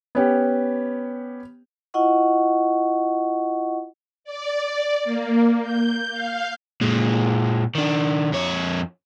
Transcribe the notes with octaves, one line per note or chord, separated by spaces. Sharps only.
B3 C#4 G4
E4 F4 D#5 F#5 C#6
D5
A#3
G6
F5
A#2 G#3
D#3 D4
F2 C#5